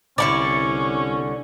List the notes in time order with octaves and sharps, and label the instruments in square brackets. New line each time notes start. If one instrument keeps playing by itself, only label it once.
[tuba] C2 [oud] D3 E4 [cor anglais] C#4 [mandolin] D5 C#6